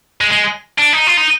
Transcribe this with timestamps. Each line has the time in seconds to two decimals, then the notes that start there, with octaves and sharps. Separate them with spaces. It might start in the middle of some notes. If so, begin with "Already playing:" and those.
0.21 G#3
0.32 G#3
0.79 D4
0.93 D#4
1.07 F4
1.17 D#4